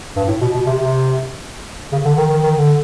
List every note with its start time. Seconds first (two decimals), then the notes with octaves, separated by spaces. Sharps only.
0.16 G2
0.28 A2
0.41 B2
0.54 B2
0.66 C3
0.79 C3
1.92 C#3
2.05 D3
2.17 D#3
2.30 D#3
2.43 D#3
2.55 D3